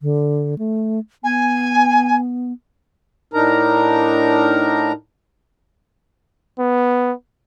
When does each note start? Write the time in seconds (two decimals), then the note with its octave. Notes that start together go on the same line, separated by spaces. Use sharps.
0.01 D3
0.59 A3
1.24 B3 G#5
3.34 A2 D4 D#4 A#4 A#5
6.59 B3